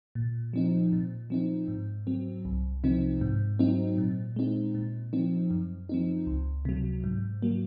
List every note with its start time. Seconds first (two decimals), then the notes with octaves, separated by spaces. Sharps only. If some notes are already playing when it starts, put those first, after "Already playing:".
0.15 A#2
0.53 F3 C4 D#4
0.93 A#2
1.30 F3 C4 D#4
1.68 G#2
2.07 F#3 C4
2.45 C2
2.84 C3 F3 C4 D#4
3.21 G#2
3.59 F#3 C4 D#4
3.98 A#2
4.36 G#3 C4 D#4
4.75 A#2
5.13 F3 C4 D#4
5.51 F#2
5.89 F3 C4 D#4
6.27 C#2
6.65 C3 F#3
7.04 G#2
7.42 F#3 A#3